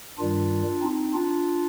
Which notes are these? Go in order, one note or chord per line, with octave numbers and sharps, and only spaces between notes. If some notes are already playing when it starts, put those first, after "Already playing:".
G2 D#3 G3 D4 F4
C4 D#4
D4 F4